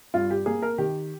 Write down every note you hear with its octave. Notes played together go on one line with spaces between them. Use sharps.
G2 F4
G4
A#3 G#4
A#4
D#3 G4